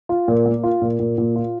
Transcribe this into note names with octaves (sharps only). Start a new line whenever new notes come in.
F4
A#2
A#3
F4
A#2
A#2
A#2
F4